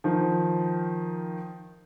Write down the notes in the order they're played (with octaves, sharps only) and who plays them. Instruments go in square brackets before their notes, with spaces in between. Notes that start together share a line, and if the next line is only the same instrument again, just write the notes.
[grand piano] D#3 F3